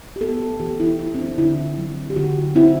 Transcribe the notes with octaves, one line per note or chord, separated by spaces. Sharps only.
G4
B3 A4
E3 G4
E4
E3 E4
C4
D4
D3 E4
F#3
G4
D3 F#4
C4 E4